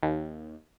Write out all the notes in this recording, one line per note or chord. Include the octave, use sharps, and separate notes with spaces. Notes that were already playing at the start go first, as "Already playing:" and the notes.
D#2